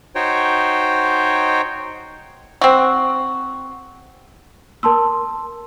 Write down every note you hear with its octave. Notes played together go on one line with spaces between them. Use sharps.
D#4 F#4 C5 C#5 G5
C4 F#4
A#4 A5 C6 E6